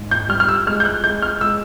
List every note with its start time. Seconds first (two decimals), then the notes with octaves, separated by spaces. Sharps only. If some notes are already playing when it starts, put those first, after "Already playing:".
Already playing: G#2
0.11 G6
0.29 G3 F6
0.40 F6
0.49 E6
0.66 G#3 F6
0.80 G6
0.85 F#6
1.04 G#3 G6
1.22 F6
1.41 G#3 E6